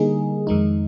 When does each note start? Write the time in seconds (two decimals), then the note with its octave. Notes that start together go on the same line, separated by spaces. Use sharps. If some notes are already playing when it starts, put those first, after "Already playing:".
Already playing: D3 G3 A#3 D#4 G#4
0.47 F2 D#3 G#3 D#4